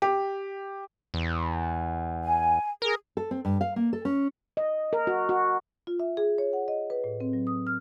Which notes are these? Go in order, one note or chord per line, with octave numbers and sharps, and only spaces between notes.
G4
E2
G#5
G#4 A#4
A4
C4
G2
F5
A#3
A4
C#4
D#5
A#4
F#4
F#4
F4
E5
G#4
C#5
F#5
D#5
B4
A2
C4
F#3
D#6
F6